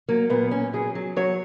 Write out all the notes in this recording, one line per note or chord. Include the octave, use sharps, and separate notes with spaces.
F#3 A#3
A#2 B3
A#2 C#4
F#3 G#4
F#3
F#3 C#5